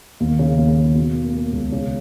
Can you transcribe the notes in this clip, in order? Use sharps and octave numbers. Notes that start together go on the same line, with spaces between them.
D#2
C#3
D#2
D#2
B2
A#3
A#3
C#2
C#3